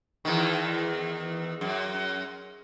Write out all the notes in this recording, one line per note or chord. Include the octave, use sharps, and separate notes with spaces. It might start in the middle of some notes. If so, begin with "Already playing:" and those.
E2 D#3
F#2